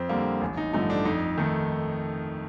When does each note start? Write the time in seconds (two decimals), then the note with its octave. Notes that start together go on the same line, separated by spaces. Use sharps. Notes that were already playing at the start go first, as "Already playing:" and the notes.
Already playing: F2 C4
0.09 D3 G3 A#3
0.41 A1
0.57 D#4
0.73 G2 D3 F3 A3 D#4
0.90 D4
1.05 F2 D#4
1.38 D#3 A3